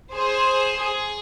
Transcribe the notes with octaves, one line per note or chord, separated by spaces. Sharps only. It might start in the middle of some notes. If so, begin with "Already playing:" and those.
G#4 C5
G#4